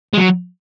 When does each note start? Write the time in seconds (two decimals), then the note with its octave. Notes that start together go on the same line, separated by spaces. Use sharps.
0.13 G#3
0.17 F#3